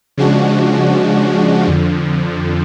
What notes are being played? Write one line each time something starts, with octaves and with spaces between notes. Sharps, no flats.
C#3 F3 G#3 D4 F#4
F2 D3 F3